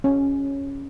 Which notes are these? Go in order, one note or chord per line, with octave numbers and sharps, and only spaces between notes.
C#4